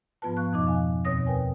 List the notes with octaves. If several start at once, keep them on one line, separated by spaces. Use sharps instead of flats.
G#2 F3 B3 F4 B4 A5
F5 C#6 F#6
F2 B2 F3 D#4 D#5 D6
F5 G#5
D#2 B2 C4 C#5 D#6 A#6
D#2 A#4 B4 G5 G#5